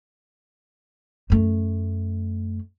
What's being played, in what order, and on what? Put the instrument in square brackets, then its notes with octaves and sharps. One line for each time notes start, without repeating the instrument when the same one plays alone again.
[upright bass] F#2 A3